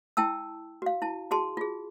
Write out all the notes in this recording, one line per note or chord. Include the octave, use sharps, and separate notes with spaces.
E4 G5 A5 E6
F#4 F5
E4 A5
F#4 G#4 A5 C6
F4 G#4